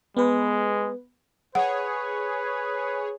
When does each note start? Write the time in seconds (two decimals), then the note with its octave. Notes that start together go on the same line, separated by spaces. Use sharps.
0.17 G#3 B3 B4
1.55 G#4 B4 C#5 F#5